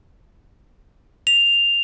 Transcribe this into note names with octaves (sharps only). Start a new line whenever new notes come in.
F7